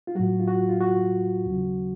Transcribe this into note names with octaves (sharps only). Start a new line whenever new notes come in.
F4
A2 F#3 F#4
F4
F#4
F4
F#4
D#2 C#3 F#3